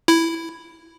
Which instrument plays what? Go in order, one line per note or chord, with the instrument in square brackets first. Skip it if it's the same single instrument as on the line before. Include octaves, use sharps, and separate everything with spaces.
[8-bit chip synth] E4